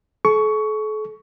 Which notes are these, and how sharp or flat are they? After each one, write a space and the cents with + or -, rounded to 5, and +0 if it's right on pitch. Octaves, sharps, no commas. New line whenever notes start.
A4 -40 C#6 +15